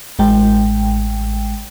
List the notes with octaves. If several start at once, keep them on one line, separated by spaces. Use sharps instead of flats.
A1 G#3 G5